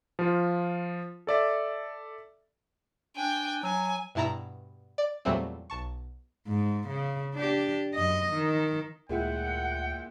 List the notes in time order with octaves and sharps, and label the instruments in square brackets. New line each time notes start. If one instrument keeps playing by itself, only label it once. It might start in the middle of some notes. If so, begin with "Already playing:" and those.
[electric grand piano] F3 F4
A4 D5 E5
[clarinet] D4 [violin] G5 G#5
[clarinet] F#3 [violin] G#5
[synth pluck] G2 B2 E4 A5 A#5 B6
D5
E2 A#2 F#3 G3 A3 C4
B1 A5 C#6
[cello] G#2
C#3
D4 G4
F#2 D#5
D#3
[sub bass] D2 [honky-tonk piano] A#2 G#3 E4 [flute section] F#5 [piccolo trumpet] G5